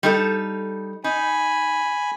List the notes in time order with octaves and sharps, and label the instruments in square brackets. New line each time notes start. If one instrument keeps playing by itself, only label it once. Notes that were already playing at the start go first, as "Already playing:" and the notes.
[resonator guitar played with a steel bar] G3 D#4 A4
[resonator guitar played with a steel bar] D#4 [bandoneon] G#5 B5